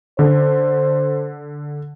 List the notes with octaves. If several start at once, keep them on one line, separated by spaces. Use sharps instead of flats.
D3 C5